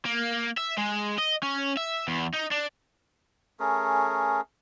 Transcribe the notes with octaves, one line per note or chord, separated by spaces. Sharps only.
A#3
E5
G#3
D#5
C#4
E5
E2
D#4
D4
A3 C#4 G#4 A#4